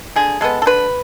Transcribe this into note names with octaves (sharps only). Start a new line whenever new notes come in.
D3 G#4
G#3 B3 A4
A4
D3 B4